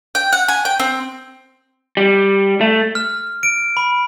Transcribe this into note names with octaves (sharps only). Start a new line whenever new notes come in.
G5
F#5
G#5
G5
C4
G3
A3
F6
D7
B5